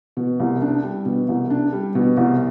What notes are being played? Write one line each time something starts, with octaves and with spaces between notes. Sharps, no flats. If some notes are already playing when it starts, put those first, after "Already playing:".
B2
C2
D4
G3
B2
C2
D4
G3
B2
C2